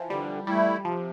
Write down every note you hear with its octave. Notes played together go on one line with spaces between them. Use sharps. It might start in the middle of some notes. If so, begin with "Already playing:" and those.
Already playing: E3 F3
D3 G3
G3 A3 E4
C3 F3